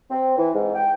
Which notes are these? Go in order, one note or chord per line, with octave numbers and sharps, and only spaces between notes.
C4
E3
G#2
G5